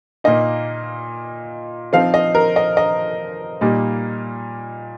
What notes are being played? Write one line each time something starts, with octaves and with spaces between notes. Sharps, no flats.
A#2 A#3 D#4 D#5
F3 C4 D#4 F5
D#5
A#4
D#5
D#5
A#2 G3 A#3 D#4